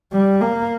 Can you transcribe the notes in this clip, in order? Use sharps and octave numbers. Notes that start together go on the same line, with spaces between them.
G3
A#3